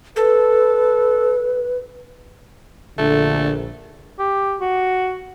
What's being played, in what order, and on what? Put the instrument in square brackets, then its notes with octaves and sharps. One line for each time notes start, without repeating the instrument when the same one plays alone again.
[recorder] A4 [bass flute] B4
[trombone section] A#1 [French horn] D3 [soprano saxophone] A3
[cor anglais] G4
F#4